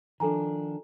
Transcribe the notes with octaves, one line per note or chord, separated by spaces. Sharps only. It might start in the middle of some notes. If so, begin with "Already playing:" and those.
D#3 F3 D4 A4 G#5 A#5